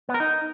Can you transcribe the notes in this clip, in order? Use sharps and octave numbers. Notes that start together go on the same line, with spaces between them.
B3
A#4
D#4